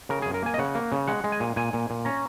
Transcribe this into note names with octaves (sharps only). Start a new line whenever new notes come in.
C#3 A#4
G#4
F#2
A#4
A#3 G#5
D#5
C#3 F#5
A#3
C#3
G#3 F#5
G#3
G#5
A#2
A#2 G#5
A#2
A#2
C#4 A#5